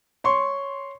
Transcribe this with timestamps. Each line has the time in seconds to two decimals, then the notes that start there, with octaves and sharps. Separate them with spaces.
0.24 C#5 C6 C#6